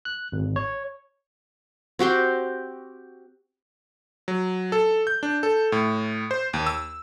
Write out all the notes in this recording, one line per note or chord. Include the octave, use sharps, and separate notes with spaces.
F#6
G#1
C#5
C4 F#4 G4 C6
F#3
A4
G6
D4
A4
A2
C5
D#2
E6